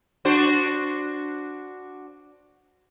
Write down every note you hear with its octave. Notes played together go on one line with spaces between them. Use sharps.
D4 F#4 C5